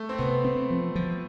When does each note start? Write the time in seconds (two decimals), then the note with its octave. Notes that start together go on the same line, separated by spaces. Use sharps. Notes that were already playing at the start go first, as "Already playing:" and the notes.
Already playing: A3
0.09 C4
0.18 C3 B3
0.44 C4
0.70 F3
0.95 F3